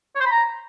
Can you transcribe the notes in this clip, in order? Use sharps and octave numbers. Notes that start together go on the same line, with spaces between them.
C#5
C5
B5
A#5